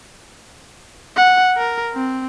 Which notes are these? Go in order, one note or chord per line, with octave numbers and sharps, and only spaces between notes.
F#5
A#4
C4